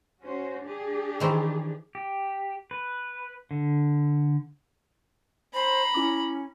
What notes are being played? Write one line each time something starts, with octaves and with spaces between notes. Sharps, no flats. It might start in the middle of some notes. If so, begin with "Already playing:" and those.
C#4 F#4 C5
D4 G4 G#4
D#3 E3 C5
G4
B4
D3
C5 A#5 B5
C#4 E4 D6